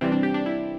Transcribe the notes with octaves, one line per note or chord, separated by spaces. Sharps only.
C3 E3 G3 C4
D4
G4
D4
E4